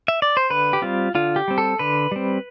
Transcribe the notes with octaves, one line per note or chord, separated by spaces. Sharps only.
E5
D5
C5
D3 B4
G4
G3 C4 F4
D3 F4
G4
G3 C4
A4
D3 B4
G3 C4